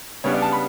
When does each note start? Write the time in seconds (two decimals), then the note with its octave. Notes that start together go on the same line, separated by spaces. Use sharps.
0.24 C#3 G3 B3 D4 C#5
0.34 D5
0.42 A5
0.52 B5